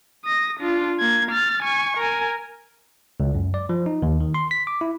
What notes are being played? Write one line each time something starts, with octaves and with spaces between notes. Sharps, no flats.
D#6 A#6
D4 F4
A#3 G#6
F6 A6
G#5 C#6
A#4 G#5
C#2
F#2
D5
F3
D#4
D#2
D#3
C6
B6
D6
E4